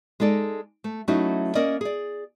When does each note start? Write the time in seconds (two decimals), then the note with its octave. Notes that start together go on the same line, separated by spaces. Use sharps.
0.20 G#3 D#4 A4 D5
0.84 A3
1.08 F#3 A3 C#4 D#4 E4 F#4
1.55 A#3 C#4 A#4 D5 D#5
1.81 G#4 D5